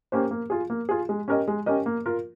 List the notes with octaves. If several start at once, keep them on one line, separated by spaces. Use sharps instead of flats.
A#3 C#4 G4 C5
A#3
F4 G#4
A#3
F4 G#4
G#3
C#4 G4 A#4 D#5
G#3
C#4 G4 A#4 D#5
A#3
F4 A#4